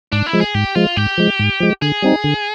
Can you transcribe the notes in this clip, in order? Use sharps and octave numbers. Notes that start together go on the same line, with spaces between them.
G#2 D4
E4
F3 G#3
G#4
G#2 G4
F3 G#3 F4
G#2 G4
F3 G#3
G#2
F3 G#3
D3 G#4
G3 C4 D#4
D3